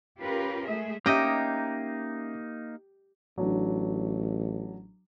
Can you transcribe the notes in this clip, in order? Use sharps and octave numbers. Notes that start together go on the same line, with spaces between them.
C#4 F4 G4 A#4 B4
G#3 A3 G#4 E5
A#3 C#4 D#4 G4 D#5 E5
A1 F#3 D4